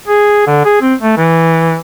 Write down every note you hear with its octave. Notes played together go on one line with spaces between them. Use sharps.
G#4
D3
G#4
C4
A3
E3